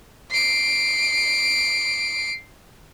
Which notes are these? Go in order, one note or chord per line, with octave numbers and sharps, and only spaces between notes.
C7 D7